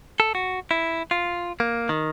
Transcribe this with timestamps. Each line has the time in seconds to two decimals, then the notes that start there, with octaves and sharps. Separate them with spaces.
0.20 A4
0.35 F#4
0.71 E4
1.11 F4
1.60 A#3
1.89 D#3